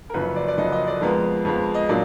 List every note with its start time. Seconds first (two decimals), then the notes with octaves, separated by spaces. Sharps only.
0.10 A#4
0.14 F#1 F#2 F3 B4
0.36 D5
0.48 D5
0.57 F#1 F#2 F3 D#5
0.72 D#5
0.87 D5
1.01 F2 F3 G#3 B3 A#4
1.45 F2 F3 G#3 B3
1.74 D#5
1.89 A#2 F#3 A#3 D4 D5